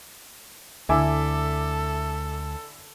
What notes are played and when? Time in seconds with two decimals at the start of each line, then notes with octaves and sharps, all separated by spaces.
0.89 D2 D3 E4 A4 E5 G#5 D6 E6